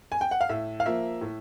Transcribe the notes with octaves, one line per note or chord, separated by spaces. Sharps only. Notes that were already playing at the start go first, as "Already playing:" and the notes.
G#5
G5
F#5
F5
A2 E5
F5
F3 A#3 E5
A2